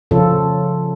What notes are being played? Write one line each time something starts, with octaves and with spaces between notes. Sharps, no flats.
C#3 F3 C#4 F4 A4